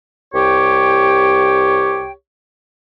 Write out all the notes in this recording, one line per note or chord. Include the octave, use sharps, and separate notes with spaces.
C2 G4 C#5 G5